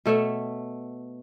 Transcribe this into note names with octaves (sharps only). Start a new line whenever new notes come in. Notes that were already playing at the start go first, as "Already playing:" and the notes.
B2 A3 C#5 E5